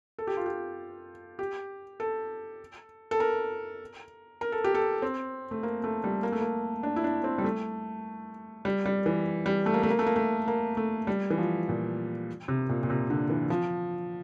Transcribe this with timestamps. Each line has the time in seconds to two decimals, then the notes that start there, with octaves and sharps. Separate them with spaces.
0.19 A4
0.27 G4
0.37 F4
0.46 G4
1.39 G4
2.00 A4
3.11 A4
3.20 A#4
4.41 A#4
4.52 A4
4.64 G4
4.75 A4
5.02 C4
5.51 A3
5.63 A#3
5.84 A3
6.04 G3
6.23 A#3
6.32 A3
6.41 A#3
6.83 D4
6.96 E4
7.04 D4
7.24 C4
7.38 G3
7.44 A3
8.65 G3
8.86 G3
9.06 E3
9.46 G3
9.66 A3
9.74 A#3
9.83 A3
9.90 A#3
9.99 A3
10.06 A#3
10.16 A3
10.48 A#3
10.77 A3
11.07 G3
11.30 E3
11.38 F3
11.69 A#2
12.48 C3
12.69 A#2
12.83 A#2
12.90 C3
13.10 D3
13.30 E3
13.50 F3